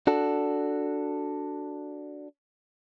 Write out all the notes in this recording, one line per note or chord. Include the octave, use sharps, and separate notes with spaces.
D4 F#4 A4